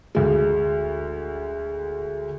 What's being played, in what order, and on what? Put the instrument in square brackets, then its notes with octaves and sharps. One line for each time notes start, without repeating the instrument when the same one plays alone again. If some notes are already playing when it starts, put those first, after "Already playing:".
[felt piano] D2 G#3